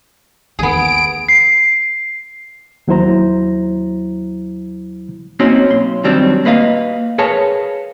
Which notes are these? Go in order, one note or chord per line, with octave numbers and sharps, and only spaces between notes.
D#2 D#3 B3 G#4 D7
C7
D#2 F#3 E4 C5 A#5
A#3 C4 C#4 D#4 F#4
B1 C6
D#3 F#3 G3 C4 D4
A#3 B4 D#5 F5
G#4 A#4 B4 C#5 F5 A5